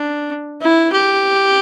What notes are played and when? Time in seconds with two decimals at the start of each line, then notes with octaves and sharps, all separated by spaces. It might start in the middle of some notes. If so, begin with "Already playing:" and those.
Already playing: D4
0.61 E4
0.93 G4